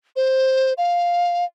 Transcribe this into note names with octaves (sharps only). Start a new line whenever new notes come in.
C5
F5